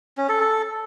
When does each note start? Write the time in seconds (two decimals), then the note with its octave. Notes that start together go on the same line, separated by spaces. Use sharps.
0.17 C#4
0.29 A4
0.41 A4